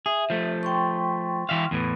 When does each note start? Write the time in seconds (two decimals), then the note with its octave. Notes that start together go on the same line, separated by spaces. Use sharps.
0.06 G#4 E5
0.30 F3 A3
0.63 G5 C6 C#6
1.49 E3 E5 F5
1.71 E2 A2 E3